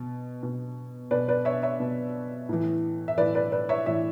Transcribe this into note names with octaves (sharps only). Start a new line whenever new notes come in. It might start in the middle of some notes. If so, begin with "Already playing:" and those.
Already playing: B2
B2
B2 B4 D5
B4 D5
C#5 E5
C#5 E5
B2
A2 E3
E5
A2 E3 B4 D5
B4 D5
B4 D5
C#5 E5
A2 E3 C#5 E5